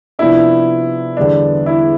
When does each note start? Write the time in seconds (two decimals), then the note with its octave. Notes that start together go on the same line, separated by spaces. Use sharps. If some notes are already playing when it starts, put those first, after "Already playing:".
0.19 C3 F3 B3 D4 E4
1.17 E2 D3 G3 B3 D4
1.66 E4